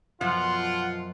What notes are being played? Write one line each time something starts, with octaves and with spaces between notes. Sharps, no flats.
F#2 B2 F3 F4 F#5